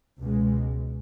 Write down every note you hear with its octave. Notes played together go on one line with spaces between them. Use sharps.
C#2 B2 G#3